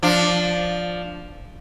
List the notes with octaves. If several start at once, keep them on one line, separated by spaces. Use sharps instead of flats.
F3 D4